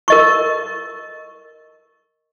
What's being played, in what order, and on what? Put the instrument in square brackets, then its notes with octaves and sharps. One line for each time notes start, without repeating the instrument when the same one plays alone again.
[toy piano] A#4 D#5 C#6